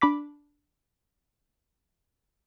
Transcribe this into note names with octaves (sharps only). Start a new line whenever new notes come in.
D4 B5 D6 B6